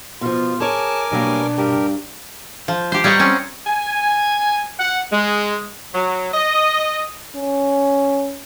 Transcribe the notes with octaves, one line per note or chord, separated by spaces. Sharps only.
B2 F3 F4
G#4 A#4 C#5 G#5 A5 D6
B2 F#3 G3 A#3 D4
G2 G4 A#4
F3
G4 C5
G3 C#5 D#5 F#5 A#5
C4 C#4
G#5
F#5
G#3
F#3
D#5
C#4